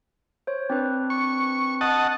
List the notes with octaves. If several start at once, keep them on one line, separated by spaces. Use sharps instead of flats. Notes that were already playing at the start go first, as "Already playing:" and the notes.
C5 C#5
C4 D4 B4
C#6
D#5 F#5 A5